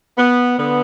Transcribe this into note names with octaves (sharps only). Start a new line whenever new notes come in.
B3
D3 B3